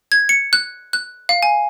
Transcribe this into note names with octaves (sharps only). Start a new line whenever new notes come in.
G#6
C#7
F#6
F#6
F5
G#5